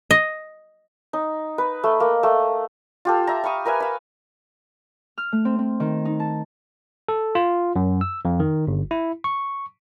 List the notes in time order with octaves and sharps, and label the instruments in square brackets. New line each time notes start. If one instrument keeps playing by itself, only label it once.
[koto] D#5
[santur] D#4
B4
A3
A#3
A3
F4 G4 A4
E5 A#5
F5 B5 C#6 D#6
A#4 B4 E5 G#5
F5 B5
[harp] F6
A3
C4
C4
D#3
D#4
A5
[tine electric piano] A4
F4
F#2
E6
F2
D#3
G1
E4
C#6